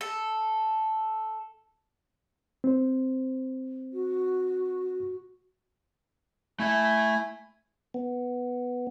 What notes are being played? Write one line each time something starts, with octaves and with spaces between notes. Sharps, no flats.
A4
C4 C5
F#4
A3 E4 E5 G#5
B3